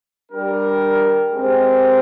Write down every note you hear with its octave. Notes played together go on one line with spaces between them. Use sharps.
G3 D4 G4 A#4
G#3 C4 G4 A#4